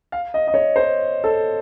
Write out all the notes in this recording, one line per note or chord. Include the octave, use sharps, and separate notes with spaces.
F5
D#5
D#5
C#5
C5
A4